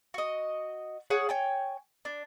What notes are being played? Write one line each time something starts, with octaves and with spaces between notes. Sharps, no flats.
F#4 D#5
G#4 C#5 F#5 F6
C#5 G5 G#5
D4